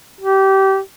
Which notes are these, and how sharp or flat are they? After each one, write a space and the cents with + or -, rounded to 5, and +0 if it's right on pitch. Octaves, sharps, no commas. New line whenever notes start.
G4 -25